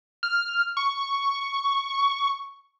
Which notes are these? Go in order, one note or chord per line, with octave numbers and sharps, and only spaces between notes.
F6
C#6